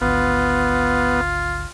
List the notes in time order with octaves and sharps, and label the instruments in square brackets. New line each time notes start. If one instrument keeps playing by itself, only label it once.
[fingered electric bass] G#1 D2 [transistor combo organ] B3 [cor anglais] F4